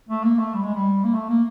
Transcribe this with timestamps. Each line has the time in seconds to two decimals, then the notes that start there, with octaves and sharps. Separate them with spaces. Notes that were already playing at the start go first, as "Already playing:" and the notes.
0.09 A3
0.24 A#3
0.39 A3
0.54 G3
0.63 G#3
0.75 G3
1.04 A#3
1.14 A3
1.29 A#3